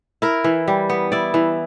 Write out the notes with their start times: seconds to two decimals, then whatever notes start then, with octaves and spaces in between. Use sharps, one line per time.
0.22 E4 A#4
0.44 E3
0.68 G3
0.90 B3
1.12 E4 D5
1.34 E3